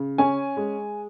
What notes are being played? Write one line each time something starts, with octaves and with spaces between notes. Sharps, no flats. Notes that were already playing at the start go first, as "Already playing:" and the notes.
Already playing: C#3
C#4 G#5
G#3